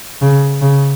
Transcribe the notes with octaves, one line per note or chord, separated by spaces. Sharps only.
C#3
C#3